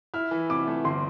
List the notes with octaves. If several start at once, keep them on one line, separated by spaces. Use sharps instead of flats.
E4 F6
E3
C3 D6
A3
G1 C6